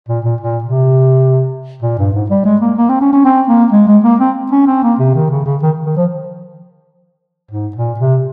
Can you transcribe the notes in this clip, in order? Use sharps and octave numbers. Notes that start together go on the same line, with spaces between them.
A#2
A#2
A#2
C3
A#2
G2
G#2
G3
G#3
A#3
A#3
C4
C#4
C#4
C4
A#3
G#3
G#3
A#3
C4
C#4
C4
A#3
C3
D#3
C#3
C#3
D#3
D#3
F3
G#2
A#2
C3